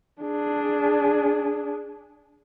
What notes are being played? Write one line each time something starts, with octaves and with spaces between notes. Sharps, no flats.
D4 G#4